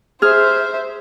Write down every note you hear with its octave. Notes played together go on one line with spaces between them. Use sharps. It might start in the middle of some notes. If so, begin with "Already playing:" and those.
G#4 C5 E5 F6